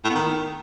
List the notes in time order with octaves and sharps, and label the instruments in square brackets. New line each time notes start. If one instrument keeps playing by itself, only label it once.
[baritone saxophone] A2
B3
D#3